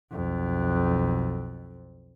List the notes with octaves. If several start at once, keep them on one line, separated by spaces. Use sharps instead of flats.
B1 F2